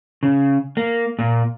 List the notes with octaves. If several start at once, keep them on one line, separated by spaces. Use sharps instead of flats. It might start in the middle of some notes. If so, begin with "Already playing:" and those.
C#3
A#3
A#2